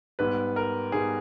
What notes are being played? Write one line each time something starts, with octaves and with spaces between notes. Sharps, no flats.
G#2 G3 B3 B4
A#4
G#2 G3 B3 G#4